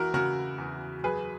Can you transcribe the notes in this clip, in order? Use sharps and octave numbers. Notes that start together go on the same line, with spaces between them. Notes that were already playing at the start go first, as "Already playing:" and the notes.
Already playing: E2 E3 E4 F#4 A#4
C#3 F#4 A#4
E2
F#2 G#4 B4